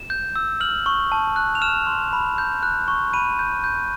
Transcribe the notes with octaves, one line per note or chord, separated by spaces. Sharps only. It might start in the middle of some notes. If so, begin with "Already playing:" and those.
Already playing: E7
G6
E6
F6 F#7
C#6
A5
F#6
F7
F6 E7
C6
B5
G6
F#6
C#6
B5 D#7
G6
G6